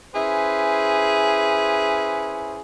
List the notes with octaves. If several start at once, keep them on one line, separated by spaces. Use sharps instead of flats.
C#4 E4 G#4 B4 C5